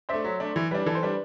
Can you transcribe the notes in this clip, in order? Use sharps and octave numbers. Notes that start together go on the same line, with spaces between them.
A3 D4 C5 E5
F#3
A3 D4
E3
G3 D4 B4
E3 A4
C5
G3 D4 B4